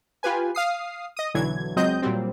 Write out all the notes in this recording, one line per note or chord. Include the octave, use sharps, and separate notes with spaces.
F4 G4 B4 G#5
F5 D#6 C7
D#5 D#6
B1 D3 E3 F#3 G#6
C#2 F#3 C4 D#5 G6
A#2 F#3 G3 C4